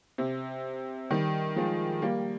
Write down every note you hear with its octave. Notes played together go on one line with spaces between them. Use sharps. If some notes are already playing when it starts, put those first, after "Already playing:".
C3
D#3 G3
F3 G#3
G3 A#3